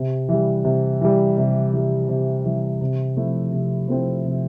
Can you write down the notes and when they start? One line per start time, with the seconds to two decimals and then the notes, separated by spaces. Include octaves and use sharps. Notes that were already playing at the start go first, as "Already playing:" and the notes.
Already playing: C3
0.29 E3 G3
0.65 C3
1.01 E3 G3
1.37 C3
1.73 E3 G3
2.09 C3
2.45 E3 G3
2.81 C3
3.17 F3 A3 C4 E4
3.53 C3
3.88 F3 A3 C4 E4
4.25 C3